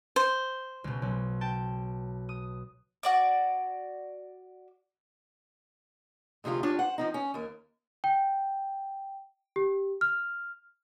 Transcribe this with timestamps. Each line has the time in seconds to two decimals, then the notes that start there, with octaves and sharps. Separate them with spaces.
0.16 C5
0.84 C#2 B2
1.02 B1
1.41 G5 A5
2.29 D#6
3.03 F#4 D5 D6
6.44 D2 C3 F3 G#3 F4
6.63 D4 F4 G4 C#5
6.79 C5 F#5
6.98 F3 C4 D#4
7.14 C#4
7.34 D#2 A#3
8.04 G5
9.56 G4
10.01 F6